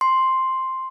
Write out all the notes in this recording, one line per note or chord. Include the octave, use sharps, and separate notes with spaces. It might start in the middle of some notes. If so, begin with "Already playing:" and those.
C6